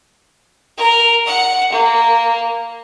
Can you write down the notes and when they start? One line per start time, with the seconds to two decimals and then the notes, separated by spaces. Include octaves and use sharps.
0.78 A#4
1.26 F#5
1.72 A#3